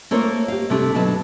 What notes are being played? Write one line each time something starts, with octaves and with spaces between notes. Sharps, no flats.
A3 A#3 F4 A#4 C5 C#5
G4 F5
C3 A3 D4 E4 G4 A4
B2 D3 F#3 B3 A5